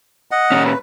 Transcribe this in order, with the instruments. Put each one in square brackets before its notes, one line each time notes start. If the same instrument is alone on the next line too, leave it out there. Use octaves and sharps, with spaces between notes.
[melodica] D#5 F#5
[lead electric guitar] A#2 C#4
[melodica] B4